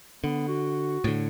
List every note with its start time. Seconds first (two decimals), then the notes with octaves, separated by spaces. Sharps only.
0.24 D3 B3
0.48 F#4
1.04 A2 D3